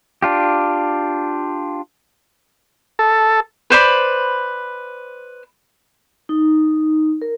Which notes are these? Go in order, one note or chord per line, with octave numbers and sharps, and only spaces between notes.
D4 F4 G4
A4
B4 C5 D5 B5
D#4
A#4